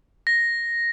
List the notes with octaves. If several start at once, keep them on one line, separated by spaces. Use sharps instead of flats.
A#6